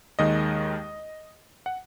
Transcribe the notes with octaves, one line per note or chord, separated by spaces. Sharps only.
D#2 D#3 G#3 D#5
F#5